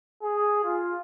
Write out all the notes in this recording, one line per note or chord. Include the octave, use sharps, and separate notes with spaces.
G#4
F4